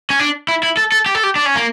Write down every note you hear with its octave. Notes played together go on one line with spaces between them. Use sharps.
C#4
D4
E4
E4
A4
A4
G4
A4
G4
D4
C#4
A#3